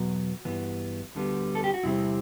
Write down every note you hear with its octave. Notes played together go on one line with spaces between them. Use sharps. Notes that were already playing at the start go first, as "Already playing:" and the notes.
Already playing: E2 B2 F#3 B3 F#4
G2 E3 B3
D2 D3 G3 B3
A4
G4
F#4
E2 C3 G3 C4 E4